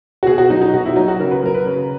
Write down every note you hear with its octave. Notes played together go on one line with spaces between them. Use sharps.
F#4
B2 G#4
F#4
F#3 D#4
D#4
B2 F#4
E4
F#3 D#4
F#4
C#3 A#4
B4
F#3 A#4
B4
C#3